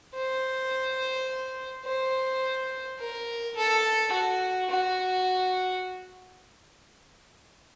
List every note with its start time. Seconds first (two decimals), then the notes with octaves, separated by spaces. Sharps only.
0.15 C5
1.85 C5
2.99 A#4
3.56 A4
4.12 F#4
4.70 F#4